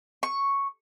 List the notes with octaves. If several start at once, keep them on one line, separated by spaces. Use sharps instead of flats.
C#6